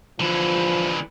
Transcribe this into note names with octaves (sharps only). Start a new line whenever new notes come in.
D3 E3 F3